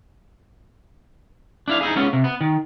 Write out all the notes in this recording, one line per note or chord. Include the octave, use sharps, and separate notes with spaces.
D4 E4 F5
D#4 E4 G#4
G#3 B3 C#4 F4
C3
B3
D#3